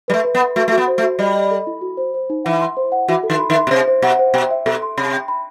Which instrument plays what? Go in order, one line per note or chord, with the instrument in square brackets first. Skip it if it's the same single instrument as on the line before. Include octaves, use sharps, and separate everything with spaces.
[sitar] G3 [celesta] B4
[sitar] A3
[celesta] B4
[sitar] B3
[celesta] B4
[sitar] A3 [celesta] F#4
[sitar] A3
[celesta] F#4
[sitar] B3
[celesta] C5
[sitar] A3
[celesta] F#4
[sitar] G3 [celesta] D#5
[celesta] D#5
A4
E4
F#4
C5
C5
D#4
[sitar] E3 [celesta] F#5
[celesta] C6
C5
F#5
[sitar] E3 [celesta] F#4
[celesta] A4
[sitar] D#3
[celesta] B5
[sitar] D#3
[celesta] E5
[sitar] B2
[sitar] C3 [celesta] C5
[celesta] C5
[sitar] B2 [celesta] F#5
[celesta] C5
[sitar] B2 [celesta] G5
[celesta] E5
[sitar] B2 [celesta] A4
[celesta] C6
[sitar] C3 [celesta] B5
[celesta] G5
B5